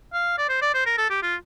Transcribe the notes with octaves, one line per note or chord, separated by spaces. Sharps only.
F5
D5
C5
D5
C5
A#4
A4
G4
F4